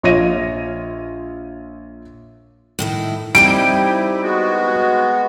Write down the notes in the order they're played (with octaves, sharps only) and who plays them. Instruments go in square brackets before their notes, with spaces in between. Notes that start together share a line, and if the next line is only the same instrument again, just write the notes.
[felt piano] A#1 F4 C#5 D#5 A#6 D#7
[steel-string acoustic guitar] A2 D#3 E4
[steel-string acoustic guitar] G3 C4 D#4 [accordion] E4 G4 [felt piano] D7
[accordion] G#3 B3 F#4